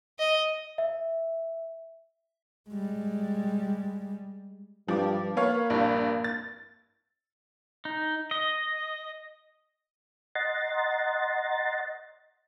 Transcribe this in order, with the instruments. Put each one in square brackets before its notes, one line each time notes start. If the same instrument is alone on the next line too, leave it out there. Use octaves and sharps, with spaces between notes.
[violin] D#5
[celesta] E5
[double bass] G3 G#3
[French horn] G2 [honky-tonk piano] F3 D6
[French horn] A#3 [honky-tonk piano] B3 C#5 F5
[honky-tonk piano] A#1 G2
A6
[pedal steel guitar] D#4
D#5
[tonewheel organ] D#5 F#5 A#5 C6 A6